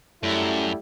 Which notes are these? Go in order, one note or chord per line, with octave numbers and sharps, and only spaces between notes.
F#2 G3 A3 E4